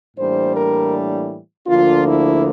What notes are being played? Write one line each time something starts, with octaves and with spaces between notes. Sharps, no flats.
A2 E3 G3 A#3 D4 C5
A#4
D2 D3 F3 A#3 D4 F4
E4